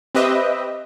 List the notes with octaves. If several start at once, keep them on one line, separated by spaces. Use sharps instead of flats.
C4 G4 B4 D#5 E5